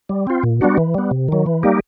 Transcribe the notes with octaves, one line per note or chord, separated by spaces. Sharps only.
G3
C4 F4
A#2
G3 B3 D4 F#4
E3
G3 B3
C3
D#3 F#3
E3
G3 A#3 D#4 G4